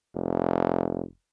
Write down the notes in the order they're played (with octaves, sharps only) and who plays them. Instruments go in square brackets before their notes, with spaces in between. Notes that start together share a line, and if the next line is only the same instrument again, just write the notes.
[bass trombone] F1